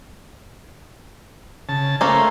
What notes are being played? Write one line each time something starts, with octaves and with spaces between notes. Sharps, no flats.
C#3 A5
A3 A#3 C#4 C5 A#5